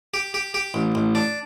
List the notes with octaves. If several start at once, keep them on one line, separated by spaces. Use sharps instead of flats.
G4
G4
G4
A1
A1
D4